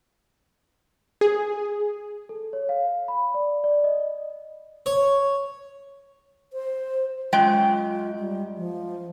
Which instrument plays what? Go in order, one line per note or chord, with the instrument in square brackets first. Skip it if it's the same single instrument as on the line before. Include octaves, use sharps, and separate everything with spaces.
[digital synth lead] G#4
[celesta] A4
C#5
F5
B5
D5
D5
D#5
[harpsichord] C#5
[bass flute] C5
[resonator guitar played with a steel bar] F#2 G#3 G5 [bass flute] F4
[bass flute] G3
F3